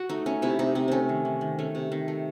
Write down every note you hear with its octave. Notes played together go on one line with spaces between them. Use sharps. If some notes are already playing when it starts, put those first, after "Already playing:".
Already playing: F#4
A3 D#4
A3 C#4
C3 E4
C3 D#4
C3 C4
A3 C4 C#4
D#3
D#3
D#3
A3 C#4
C3
D#3
A3